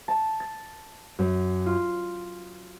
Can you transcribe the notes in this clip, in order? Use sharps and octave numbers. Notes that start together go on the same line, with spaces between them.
A5
A6
F#2
F4